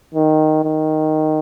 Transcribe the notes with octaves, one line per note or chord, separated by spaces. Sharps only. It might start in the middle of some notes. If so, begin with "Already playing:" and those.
D#3
D#3